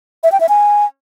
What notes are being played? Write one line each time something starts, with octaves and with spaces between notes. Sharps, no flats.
E5
G5
E5
G#5